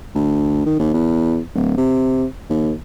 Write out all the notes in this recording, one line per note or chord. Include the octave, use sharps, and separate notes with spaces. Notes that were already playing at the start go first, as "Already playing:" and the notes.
D2
D#3
D#2
E2
D1
C3
D#2